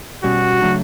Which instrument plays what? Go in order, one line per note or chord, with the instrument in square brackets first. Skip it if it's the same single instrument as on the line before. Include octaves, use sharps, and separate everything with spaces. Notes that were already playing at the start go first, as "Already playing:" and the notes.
[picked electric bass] B2 G3 C#4 [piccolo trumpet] F#4
[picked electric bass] C#3 F#3 A3 D4